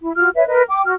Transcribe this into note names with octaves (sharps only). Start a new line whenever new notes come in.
E4
F4 F#4 F6
B4 C#5 E5
A#4 B4 D#5
G5 D6
F#4 F6